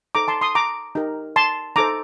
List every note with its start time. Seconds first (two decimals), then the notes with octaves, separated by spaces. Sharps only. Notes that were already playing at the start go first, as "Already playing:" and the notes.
0.15 D#4 A4 C5 A#5 D6
0.28 A5 C6
0.41 C6 D#6
0.55 A#5 D6
0.95 D#4 G4 A#4
1.36 A5 C6
1.76 D#4 A4 C5 A#5 D6